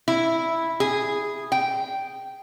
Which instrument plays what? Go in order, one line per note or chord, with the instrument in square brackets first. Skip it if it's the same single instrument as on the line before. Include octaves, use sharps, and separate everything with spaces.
[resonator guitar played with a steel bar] E4
G#4
G5